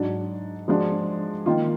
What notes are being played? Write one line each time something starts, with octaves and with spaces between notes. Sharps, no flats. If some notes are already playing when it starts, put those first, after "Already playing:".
Already playing: G#2 F#3 D4
F3 G#3 D4 F#4
D#3 A#3 F4